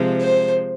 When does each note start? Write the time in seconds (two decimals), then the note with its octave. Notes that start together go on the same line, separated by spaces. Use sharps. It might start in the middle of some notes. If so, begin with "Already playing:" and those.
Already playing: C3 F3 G#3
0.20 C5